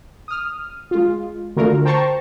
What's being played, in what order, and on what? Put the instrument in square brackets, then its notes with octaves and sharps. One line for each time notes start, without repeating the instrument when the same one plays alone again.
[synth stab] D#6 F6
G#3 F4
D3 A3 F4 F#4 A#4
C5 G5 A5 A#5 C6 C#6